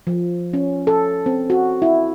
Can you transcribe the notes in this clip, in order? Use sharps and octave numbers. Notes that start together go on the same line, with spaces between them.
F3
C#4
A4
C4
F#4
E4